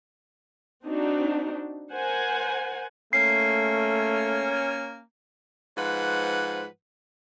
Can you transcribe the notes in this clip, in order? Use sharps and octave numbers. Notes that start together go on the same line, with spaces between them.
C4 D4 D#4 F#4
A#4 C5 F#5 G#5
A3 A#3 C#4 C7
G#2 F3 B4 C5 F#5